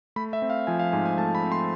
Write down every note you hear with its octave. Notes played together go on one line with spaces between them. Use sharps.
A3 B5
E5
C4
F5
F3 G#5
F5
G#2 G#5
G#5
A3 A5
B5
C4
C6